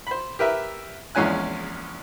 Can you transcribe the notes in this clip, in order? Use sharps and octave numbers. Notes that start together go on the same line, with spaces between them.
C5 B5
G4 A#4 B4 E5
A#1 E2 G#3 C#4 G#5 F#6